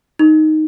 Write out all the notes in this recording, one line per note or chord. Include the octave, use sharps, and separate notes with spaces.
D#4